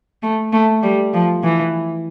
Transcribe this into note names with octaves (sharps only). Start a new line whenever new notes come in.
A3
A3
G3
F3
E3